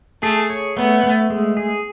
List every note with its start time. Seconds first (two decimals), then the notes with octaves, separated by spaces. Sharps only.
0.23 A3 G#4
0.50 C#5
0.77 A3 B3
1.04 A3
1.30 G#3
1.57 G#4